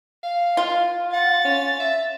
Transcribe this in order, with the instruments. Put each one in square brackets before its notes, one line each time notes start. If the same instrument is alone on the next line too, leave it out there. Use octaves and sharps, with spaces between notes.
[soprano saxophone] F5
[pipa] F4
[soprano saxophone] F#5 [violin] A6
[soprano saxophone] C#4
E5